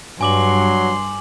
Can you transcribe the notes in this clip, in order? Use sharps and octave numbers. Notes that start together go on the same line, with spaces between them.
G2 F#3 G#5 C6 D6 F#7